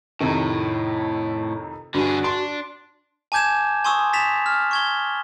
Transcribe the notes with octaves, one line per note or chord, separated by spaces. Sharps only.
F2 A2 C3 D#3
G2 D3 F#4 G#4
D4 C6
G#5 A5 D6 G6 G#6 E7
G#5 C6 C#6 D#6 E6
A6 B6 E7 F7
F6
C#6 G#6 G7